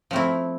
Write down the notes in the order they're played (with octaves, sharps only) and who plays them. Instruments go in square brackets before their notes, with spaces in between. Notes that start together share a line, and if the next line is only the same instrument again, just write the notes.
[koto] F3 A3 C4 E4